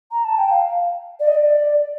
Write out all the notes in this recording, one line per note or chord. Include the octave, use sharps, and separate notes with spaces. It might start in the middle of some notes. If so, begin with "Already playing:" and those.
A#5
A5
G5
F5
D5
D#5
D5